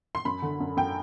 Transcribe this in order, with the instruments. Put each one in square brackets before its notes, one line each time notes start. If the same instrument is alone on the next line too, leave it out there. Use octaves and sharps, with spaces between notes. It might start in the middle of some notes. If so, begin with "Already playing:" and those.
[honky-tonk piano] C6
F#2 B5
D3
F#2
F#2 G5